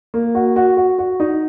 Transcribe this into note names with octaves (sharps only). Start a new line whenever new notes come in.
A#3
F#4
F#4
F#4
F#4
D#4